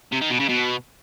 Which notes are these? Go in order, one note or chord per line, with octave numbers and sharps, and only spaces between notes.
C3
D#3
B2
C#3
B2